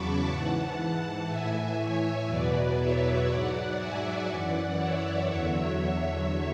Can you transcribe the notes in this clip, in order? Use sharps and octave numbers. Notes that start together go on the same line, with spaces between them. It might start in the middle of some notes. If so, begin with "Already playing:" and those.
Already playing: E2 C#3 F#3 A5 B5 C#6 D6
G#2 E3 F#5 A5
F#5 A5
A2 E3 E5 G#5
C#5 E5
E2 B2 F#3 B4 D5
C#5 E5
G#2 F#3 D5 F#5
E5 G#5
F#2 E3 D5 F#5
C#5 E5
E2 D3 F#3 C#5 E5